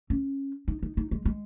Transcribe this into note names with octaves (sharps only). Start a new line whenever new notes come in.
C#4
D#4
D#4
D#4
G#3
G#3